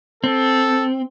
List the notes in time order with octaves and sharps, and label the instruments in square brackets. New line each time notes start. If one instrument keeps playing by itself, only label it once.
[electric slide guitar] C4 [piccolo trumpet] A4